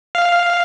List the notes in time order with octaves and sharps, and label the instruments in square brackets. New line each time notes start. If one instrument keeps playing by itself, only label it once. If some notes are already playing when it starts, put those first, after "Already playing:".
[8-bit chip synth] F5